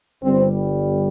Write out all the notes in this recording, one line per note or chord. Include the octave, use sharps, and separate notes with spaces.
G1 G2 G3 C4